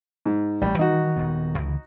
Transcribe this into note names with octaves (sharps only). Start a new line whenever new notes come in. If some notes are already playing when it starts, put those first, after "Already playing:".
G#2
A1 G3 A3
D#3 E3 G3 D#4 F#4
D#1 D#3 B3
C#2 D3 E3